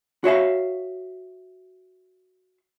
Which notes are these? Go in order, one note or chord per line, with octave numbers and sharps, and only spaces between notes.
F#4 C#5 E5 F5